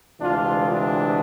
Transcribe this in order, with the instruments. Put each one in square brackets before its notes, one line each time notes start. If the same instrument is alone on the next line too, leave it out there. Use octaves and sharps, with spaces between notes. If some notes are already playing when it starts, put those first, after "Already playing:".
[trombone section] D2 C3 E3 G#3 D4 F4
D4